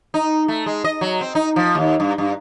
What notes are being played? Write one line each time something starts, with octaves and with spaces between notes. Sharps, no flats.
D#4
A3
G#3
D#5
F#3
C4
D#4
F3
D#2
G2
G2